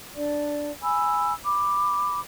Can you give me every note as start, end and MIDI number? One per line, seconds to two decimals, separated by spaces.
0.16 0.71 62
0.16 0.71 74
0.82 1.33 80
0.82 1.33 83
0.82 1.33 88
1.44 2.18 83
1.44 2.18 86